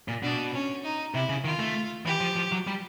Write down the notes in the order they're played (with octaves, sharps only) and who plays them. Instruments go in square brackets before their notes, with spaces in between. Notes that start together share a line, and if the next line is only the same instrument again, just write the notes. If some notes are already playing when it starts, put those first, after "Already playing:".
[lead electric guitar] A#2
[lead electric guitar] B2 [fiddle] D4
[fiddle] C#4
D#4
[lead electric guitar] C3 [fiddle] E4
[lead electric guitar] C#3
[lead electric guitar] D#3 [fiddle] F4
[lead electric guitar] A3
[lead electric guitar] E3 [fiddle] G4
[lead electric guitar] F3
F3
F#3
G3